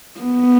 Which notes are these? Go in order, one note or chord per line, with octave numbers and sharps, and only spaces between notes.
B3